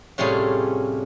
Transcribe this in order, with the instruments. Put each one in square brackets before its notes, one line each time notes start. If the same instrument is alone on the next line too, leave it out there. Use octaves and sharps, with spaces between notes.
[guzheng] A2 C3 G3 C#4 F4 G#4